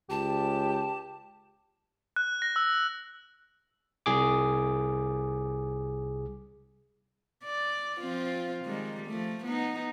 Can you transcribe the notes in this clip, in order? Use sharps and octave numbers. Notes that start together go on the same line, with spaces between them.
C#2 G4 A5
F#6
A#6
E6
C2 G#4 D6
D5
F3 C4 F4
D#3 G3 G#3
F3 A3
B3 D#4